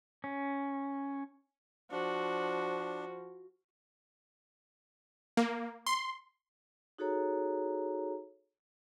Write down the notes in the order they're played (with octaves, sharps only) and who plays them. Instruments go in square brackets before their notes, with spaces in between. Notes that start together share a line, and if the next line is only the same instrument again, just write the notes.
[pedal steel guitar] C#4
[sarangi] F3 [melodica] D4 [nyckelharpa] F#4
[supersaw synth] A#3
C6
[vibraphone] D#4 F#4 G#4 A4 C#5 A#5